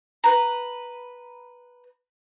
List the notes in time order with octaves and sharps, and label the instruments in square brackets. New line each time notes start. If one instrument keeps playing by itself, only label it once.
[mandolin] B4 A#5